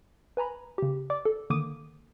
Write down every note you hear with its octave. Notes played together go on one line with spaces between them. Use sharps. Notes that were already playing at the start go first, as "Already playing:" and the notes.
B4 G#5 A#5 B5
C#3 G4
D5 D6
A4
D3 D#3 A#3 D6 D#6 D#7